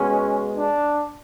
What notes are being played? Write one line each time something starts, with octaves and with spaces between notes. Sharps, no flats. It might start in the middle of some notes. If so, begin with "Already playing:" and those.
Already playing: B2 G#3 B3 C#4
D4